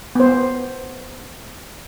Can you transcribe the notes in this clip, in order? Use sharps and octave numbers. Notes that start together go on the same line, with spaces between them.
B3 C5